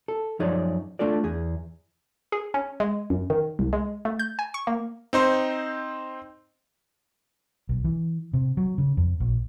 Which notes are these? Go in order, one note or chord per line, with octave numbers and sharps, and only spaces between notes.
A4
F#2 F3 D#4 G#4 C#5 D5
A3 D4 F4 A4 D5
E2 G#4
G#4
C#4
G#3
F#2
D#3
C2
G#3
A3
G6
G#5
C#6
A#3
C4 D#4 C5
B1
E3
C3
F#3
C#3
F2
A#1